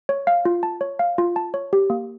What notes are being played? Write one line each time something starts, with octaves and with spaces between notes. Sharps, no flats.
C#5
F5
F4
A5
C#5
F5
F4
A5
C#5
G4
A#3